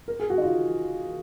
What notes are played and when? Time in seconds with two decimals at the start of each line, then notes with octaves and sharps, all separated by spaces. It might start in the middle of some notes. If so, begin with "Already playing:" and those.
0.08 A#4
0.20 G#4
0.30 F#4
0.38 D#4
0.41 F4